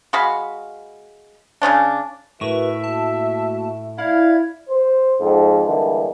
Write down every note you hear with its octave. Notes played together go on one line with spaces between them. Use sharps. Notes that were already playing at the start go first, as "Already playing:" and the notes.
G#3 F#4 F5 B5
C#3 E3 C#4 D4
A2 F#4 A#4 B4 E5 C#6
A3 A#3 F#4 A5
E4 D5 E5 F5 G#6
C5
F2 G#2
D3 E3 G3 G#3 A#3